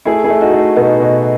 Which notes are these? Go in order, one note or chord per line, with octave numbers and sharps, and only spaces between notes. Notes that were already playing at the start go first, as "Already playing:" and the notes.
A3 E4 G#4
E4 G#4
A3
D#4 F#4
A3
B2 B3 D#4
B2